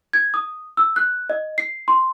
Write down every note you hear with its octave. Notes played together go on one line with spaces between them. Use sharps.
G#6
D#6
E6
F#6
D#5
C7
C6